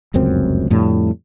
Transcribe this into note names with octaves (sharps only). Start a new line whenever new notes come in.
F1 C#2 F#2 C4
F2 A2 D3 G3